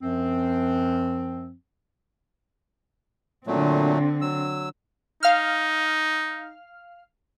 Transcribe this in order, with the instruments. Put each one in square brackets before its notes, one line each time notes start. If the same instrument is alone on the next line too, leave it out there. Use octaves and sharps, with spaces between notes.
[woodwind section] F#2 F3 C4
[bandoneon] A#2 F#3 A3 [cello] D3 C4
[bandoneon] F#3 E6
[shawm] D#4 [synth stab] F5 F6